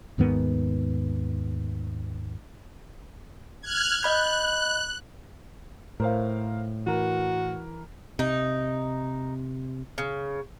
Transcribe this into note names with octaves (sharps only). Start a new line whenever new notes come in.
D#2 G#2 D#3 B3
F6 F#6 G#6
D#5 B5 F#6 G6
A2 A#4 C5 F5
E3 F#4 A#4
C3 D#4
C#3